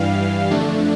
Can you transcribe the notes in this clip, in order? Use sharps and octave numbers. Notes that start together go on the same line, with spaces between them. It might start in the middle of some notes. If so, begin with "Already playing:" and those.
Already playing: G2 E3 G3 F5
F2 D3 A3 D4